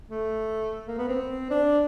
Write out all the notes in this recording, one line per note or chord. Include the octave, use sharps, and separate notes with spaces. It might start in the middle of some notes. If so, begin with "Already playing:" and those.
A3
A#3
B3
C4
D4